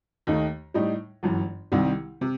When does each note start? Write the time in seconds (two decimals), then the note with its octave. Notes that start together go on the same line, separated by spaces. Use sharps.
0.27 D#2 D#3 A3 D#4
0.74 A2 G3 D#4
1.23 G1 F#2 E3
1.72 C2 C3 D#3 G3
2.21 C3